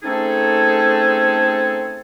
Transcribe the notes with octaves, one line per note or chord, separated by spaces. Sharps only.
A3 C4 C#4 D#4 G#4 A4